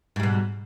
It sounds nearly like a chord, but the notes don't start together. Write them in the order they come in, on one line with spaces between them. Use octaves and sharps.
G#2 G3 B2